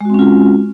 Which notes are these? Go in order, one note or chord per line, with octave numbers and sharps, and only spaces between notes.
G#3 C4 C#4 F4 F#4